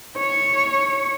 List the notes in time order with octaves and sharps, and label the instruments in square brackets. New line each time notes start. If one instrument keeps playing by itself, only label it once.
[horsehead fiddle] C#5